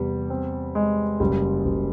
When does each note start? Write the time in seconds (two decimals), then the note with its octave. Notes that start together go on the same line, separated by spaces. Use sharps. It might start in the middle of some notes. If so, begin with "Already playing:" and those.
Already playing: E2 C3 G3
0.30 C4
0.75 G#3
1.20 F#1 G3
1.65 F#1